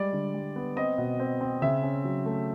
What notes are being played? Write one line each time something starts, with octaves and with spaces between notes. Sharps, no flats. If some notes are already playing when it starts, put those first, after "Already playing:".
Already playing: G3 G#3 D5
D3
G3
B3
C4 D#5
B2
C4
C4
C#3 E5
C#4
F#3
A3